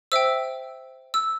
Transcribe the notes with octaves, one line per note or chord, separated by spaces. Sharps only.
C5 E5 G5 E6
E6